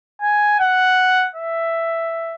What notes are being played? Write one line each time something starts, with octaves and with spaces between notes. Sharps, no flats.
G#5
F#5
E5